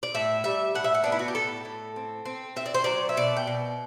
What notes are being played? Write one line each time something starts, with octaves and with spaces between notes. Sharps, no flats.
D5
A2 E5
G3 E5
A2 F#5
E5
F#5
B3 D4
E4
F#4
G4
A2 A4
A2
C4
C4
C4 E5
D5
C5
F#3 D5
E5
B2 D5
G5
B2